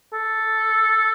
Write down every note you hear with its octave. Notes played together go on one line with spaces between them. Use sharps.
A4